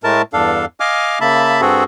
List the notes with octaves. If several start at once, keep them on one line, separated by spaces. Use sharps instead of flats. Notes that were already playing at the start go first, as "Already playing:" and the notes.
A2 G#3 A3 A#4 A5
E2 G2 D4 A4 F5
D#5 F5 G#5 D6 F6
C#3 A#3 E5 A5 B5
G2 C4 F#4 G#4 A4